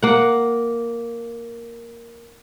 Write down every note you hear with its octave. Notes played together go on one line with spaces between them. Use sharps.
A#3 F#5